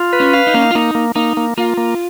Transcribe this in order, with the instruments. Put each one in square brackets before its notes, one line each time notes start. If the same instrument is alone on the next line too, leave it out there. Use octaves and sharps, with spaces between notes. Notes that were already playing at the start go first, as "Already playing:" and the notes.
Already playing: [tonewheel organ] F4
B4
[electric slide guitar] C#4
[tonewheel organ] F5
[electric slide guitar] D#4
[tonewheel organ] A#3 [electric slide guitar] C#4
[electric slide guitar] D#4
F4
[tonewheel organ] A#3 [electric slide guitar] D#4
[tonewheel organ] A#3
[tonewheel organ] A#3 [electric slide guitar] D#4
[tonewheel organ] A#3
[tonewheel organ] A#3 [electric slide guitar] F4
[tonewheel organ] A#3